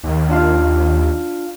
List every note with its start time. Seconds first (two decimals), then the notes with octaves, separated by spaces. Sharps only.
0.03 D#2
0.29 D4 F4 F5